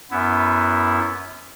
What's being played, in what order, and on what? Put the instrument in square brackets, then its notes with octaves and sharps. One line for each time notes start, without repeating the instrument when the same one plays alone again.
[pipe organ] F#2 B3 E4